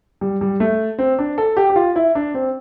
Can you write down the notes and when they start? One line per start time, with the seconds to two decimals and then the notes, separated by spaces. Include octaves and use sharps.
0.21 G3
0.41 G3
0.60 A3
0.98 C4
1.19 D4
1.38 A4
1.57 G4
1.70 G4
1.76 F4
1.96 E4
2.15 D4
2.34 C4